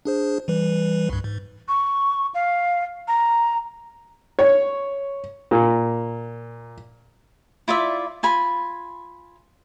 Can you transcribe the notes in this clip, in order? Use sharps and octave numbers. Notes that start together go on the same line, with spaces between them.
D4 G#4 C5
E3 G3 B4
C2 G2
G#2
C#6
F5
A#5
C#5
A#2
E4 F4 D5 E5
F4 G#5 B5